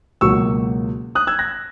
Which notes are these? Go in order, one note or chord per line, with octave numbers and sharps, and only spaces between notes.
C#2 B2 F#3 A#3 C#6 E6
D#6 F#6
E6 G#6
F#6 A#6